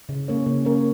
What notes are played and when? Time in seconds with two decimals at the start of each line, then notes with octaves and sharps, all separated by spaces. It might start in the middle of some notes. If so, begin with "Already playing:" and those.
0.09 C#3
0.28 A#3 C#4 A#4 C#5
0.46 C#3
0.65 A#3 C#4 A#4 C#5